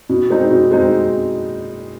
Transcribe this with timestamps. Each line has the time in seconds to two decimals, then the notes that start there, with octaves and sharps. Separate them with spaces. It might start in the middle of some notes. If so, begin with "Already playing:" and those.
0.09 B2
0.30 G#3 C4 D#4
0.51 B2
0.71 G#3 C4 D#4